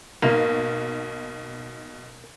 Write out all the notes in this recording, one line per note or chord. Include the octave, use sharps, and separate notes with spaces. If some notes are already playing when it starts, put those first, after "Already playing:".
B1 G#2 B2 A#3